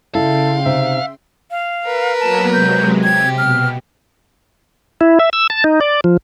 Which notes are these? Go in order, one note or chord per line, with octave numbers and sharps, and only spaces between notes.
C#3 E4 A4 D5 F5 G5 C6
C3 D#4 E5
F5
A#4 B4
F#3 A#3 B3 A5
C3 F#3 G#3 G6
C3 G4 G#6
B2 F6
E4
E5
E6
A5
D#4
D5
F3